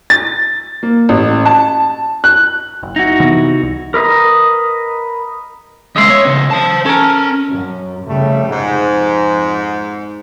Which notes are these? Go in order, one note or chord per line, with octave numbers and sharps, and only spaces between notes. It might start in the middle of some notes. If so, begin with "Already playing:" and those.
A6
A#3
A1
A5
F#6
F#1
D#4 E4 F#4
C3 E3 B3
C2
A#4 B4 D#5 A#5
C#3 G#3 D#5 E5 C6
C#5
C#3 B3
C5 A5
C#4 A4 A#4
F#2
F1 C#3 G3 A3
F2 G#2